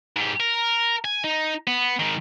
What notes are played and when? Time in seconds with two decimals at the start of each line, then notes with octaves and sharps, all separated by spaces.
0.16 G#2 G4
0.40 A#4
1.04 G#5
1.24 D#4
1.67 B3
1.99 G#2 D#3